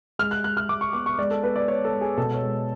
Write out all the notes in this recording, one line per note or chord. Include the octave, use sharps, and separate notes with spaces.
G#3 F6
F#6
G#3 F#6
F6
G#3 D6
C#6
B3 D6
C#6
G#3 D5
A4
B3 B4
D5
B3 C#5
A4
G#3
G#4
B2 A4
C#5
G#3